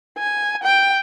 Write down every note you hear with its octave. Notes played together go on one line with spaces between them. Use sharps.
G#5
G5